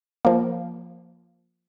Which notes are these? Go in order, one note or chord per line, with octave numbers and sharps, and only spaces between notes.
F3 A#3